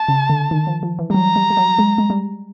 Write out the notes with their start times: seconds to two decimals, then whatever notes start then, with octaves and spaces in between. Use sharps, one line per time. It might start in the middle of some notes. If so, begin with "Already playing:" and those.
Already playing: A5
0.08 C#3
0.30 D3
0.51 D#3
0.67 F3
0.83 F3
0.99 E3
1.10 G3
1.14 F#3 A#5
1.36 G3
1.50 G3
1.57 F#3
1.78 G#3
1.98 G#3
2.10 G3